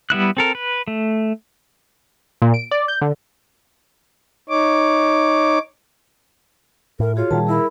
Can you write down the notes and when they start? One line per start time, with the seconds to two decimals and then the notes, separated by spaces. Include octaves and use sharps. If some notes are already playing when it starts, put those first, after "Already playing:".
0.10 G3 B3 E4 F#6
0.37 C4 A4 A#4
0.55 B4
0.88 A3
2.42 A#2
2.54 D7
2.71 D5
2.88 G6
3.01 D3
4.49 D#4 C#5 D6
7.00 A2 A#4
7.16 F4 F#4 G#4 C#5
7.31 A#2 D#3 G3 G#4 A5
7.47 E4 G#4 A#4 B5